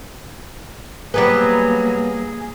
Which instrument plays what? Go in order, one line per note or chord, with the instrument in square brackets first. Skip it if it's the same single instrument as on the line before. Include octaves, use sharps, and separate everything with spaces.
[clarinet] F#3 [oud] G3 B3 B4 [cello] A#3 [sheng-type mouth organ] G#4